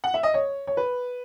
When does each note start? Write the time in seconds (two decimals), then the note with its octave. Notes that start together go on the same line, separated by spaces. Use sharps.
0.04 F#5
0.14 E5
0.23 D#5
0.34 C#5
0.67 C#5
0.77 B4